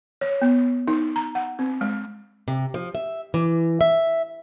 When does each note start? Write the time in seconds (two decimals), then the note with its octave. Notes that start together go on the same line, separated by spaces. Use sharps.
0.21 C#5
0.42 B3
0.88 D#4
1.16 A#5
1.35 F#5
1.59 C4
1.81 G#3
2.48 C3
2.74 F3
2.95 E5
3.34 E3
3.81 E5